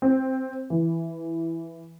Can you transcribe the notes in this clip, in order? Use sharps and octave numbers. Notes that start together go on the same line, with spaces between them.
C4
E3